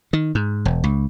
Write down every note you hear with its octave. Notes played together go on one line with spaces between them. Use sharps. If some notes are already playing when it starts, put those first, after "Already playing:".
D#3
G#2
E1
C#2